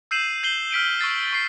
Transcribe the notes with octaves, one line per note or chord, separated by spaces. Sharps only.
E6 G6 C7 D#7 E7 F#7
G6 C7 F#7 G7
F6 B6 D7 D#7
C#6 E6 A6 C7
C#6 C7